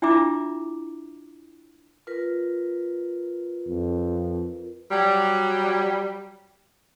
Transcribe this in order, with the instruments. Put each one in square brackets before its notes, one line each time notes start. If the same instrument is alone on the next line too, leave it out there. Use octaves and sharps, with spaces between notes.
[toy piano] D4 E4 F4 E5 A#5 D6
[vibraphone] F4 A#4 B4
[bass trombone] F2
[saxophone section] F#3 G3